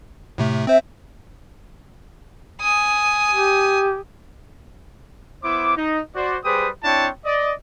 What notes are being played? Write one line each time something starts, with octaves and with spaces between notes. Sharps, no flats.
A2 C3 A3
C4 C5 E5
G#5 D#6
G4
B3 E4 C5 D6
D#4
F#4 C5 D5
G3 G4 G#4 B4 C5 D#6
C4 D4 E4 C#5 G5 A5
D5 D#5